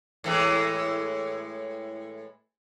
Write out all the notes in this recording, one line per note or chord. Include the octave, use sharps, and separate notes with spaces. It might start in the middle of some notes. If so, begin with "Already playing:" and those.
A2 E3 G#3